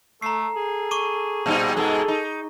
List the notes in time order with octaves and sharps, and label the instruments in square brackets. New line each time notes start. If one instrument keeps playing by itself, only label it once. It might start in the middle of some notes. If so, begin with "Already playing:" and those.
[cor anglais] A3 [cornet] A4 [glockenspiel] A#5 C7
[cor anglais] G#4
[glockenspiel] C#6 D6 D#7
[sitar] A#2 G3 D#4 [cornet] C5
[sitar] G#2 B2 G#3 [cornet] A4
[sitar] D#4